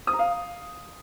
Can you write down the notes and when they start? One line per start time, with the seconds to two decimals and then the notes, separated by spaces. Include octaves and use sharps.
0.07 D#6
0.13 A#5
0.19 F5